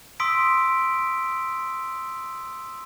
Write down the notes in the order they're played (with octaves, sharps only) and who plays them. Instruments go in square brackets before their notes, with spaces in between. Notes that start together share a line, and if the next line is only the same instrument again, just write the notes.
[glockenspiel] C6 D#6 E6 B6 D7